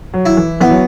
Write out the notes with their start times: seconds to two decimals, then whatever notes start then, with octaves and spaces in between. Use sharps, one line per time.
0.14 F#3
0.26 E4
0.37 E3
0.61 E3 B3
0.70 F#3